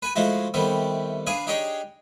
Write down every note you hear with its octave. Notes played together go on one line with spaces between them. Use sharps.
B4 G#5 B5
F3 G#3 A3 E4 F#4
D#2 C3 G3 A3 B3
D4 G#4 B4 F5 G#5
D4 D#4 G4 G#4 C#5 D#5